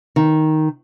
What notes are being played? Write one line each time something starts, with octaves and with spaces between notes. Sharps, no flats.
D#3